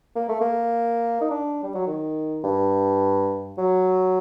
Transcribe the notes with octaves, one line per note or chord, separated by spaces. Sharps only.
A#3
A3
A#3
D#4
D4
G3
F#3
D#3
G2
F#3